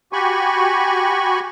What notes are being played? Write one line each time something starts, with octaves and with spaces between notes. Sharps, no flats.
F#4 G4 G#5 B5 C#6